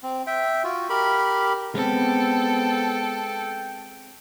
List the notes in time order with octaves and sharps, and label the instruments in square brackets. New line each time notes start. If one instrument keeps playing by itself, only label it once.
[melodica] C4
E5 G5
F4 F#4
G4 A#4 B5
[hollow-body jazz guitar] G#3 C4 [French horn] B3 [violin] A4 [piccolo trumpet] G5